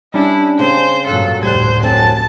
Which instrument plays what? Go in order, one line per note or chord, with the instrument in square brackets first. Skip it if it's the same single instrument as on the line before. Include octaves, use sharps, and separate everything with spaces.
[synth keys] G3 C#4 D4 [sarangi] E4
[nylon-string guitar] C#3 G#3 C4 [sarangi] C5
[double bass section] G2 A#2 F#3 [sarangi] A4 [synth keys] F5 F#6
[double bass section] F1 D2 A2 [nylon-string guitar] G3 [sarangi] C5 [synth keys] F#6 G#6
[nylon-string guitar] F#2 F#3 C4 [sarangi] A5